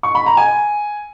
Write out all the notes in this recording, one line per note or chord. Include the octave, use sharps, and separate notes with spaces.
C#6
B5
A#5
G#5